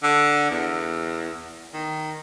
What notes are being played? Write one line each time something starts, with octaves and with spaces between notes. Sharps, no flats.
D3
E2
D#3